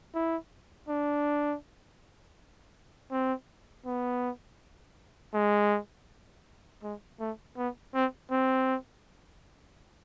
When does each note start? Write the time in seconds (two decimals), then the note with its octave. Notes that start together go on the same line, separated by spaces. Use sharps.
0.14 E4
0.88 D4
3.11 C4
3.86 B3
5.34 G#3
6.83 G#3
7.20 A3
7.57 B3
7.94 C4
8.31 C4